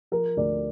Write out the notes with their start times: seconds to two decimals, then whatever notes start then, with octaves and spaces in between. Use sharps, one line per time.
0.12 F3 A#4
0.37 D2 D5